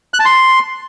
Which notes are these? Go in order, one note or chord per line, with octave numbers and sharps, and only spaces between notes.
F#6
A5
C6